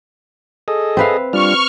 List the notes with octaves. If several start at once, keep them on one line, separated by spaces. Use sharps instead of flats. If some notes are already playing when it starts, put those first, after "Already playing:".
G#4 A4 D#5
C4 B4 F5
G3 D4 F4 C#6 F6